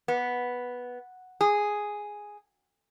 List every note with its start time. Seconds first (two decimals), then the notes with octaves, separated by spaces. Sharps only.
0.08 B3
1.41 G#4